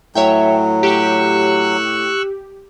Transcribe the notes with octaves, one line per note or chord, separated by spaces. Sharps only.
A2 F#3 C#5 E5 G5
G4 C#6 E6 F#6